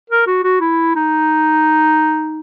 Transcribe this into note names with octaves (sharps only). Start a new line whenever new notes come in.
A#4
F#4
F#4
E4
D#4